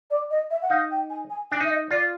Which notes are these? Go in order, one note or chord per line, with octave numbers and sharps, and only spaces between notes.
D5
D#5
E5
F#5
D#4 F5
G5
G#5
G#5
D4 G#5
D#4 E5
D#5
F4 D5